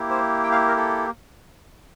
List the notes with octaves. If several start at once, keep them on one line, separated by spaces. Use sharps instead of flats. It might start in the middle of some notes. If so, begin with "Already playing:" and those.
Already playing: A#3 E4 G4
C5
G5
F5
A#4
A4